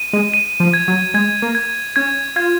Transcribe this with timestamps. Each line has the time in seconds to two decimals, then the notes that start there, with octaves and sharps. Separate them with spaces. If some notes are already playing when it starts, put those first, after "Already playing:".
Already playing: D#7
0.13 G#3
0.34 D#7
0.60 F3
0.74 G#6
0.88 F#3
1.14 G#3 G#6
1.42 A#3
1.55 G#6
1.96 C#4 G#6
2.36 F4 G#6